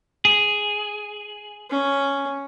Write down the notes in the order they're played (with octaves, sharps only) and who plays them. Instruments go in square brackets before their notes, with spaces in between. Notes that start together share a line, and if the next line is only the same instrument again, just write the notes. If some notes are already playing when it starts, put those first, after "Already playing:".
[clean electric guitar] G#4
[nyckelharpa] C#4